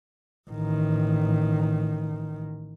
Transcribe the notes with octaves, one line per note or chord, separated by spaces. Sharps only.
A1 D#3